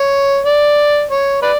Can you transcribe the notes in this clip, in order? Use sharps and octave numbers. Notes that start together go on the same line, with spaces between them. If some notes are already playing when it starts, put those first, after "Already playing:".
Already playing: C#5
D5
C#5
B4 D5